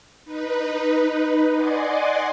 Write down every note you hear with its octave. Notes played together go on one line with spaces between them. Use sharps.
D#4 B4
D5 D#5 F#5 G#5 C6 D6